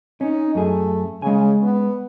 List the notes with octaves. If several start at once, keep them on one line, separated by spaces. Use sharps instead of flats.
C#4 D#4
F#2 A3 G#4
C#3 G#3 G#5
B3